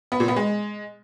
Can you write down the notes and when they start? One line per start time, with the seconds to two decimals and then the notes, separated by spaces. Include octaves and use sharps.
0.12 B3
0.20 A#2
0.28 B3
0.36 G#3